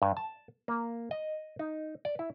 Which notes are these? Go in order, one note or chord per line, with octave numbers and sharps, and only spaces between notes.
G2
A5
A#3
D#5
D#4
D5
E4